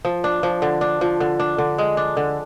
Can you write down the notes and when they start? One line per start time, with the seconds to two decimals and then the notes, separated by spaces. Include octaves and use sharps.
0.05 F3
0.24 D4
0.43 F3
0.62 D3
0.81 D4
1.01 F3
1.20 D3
1.40 D4
1.58 D3
1.78 G#3
1.97 D4
2.17 D3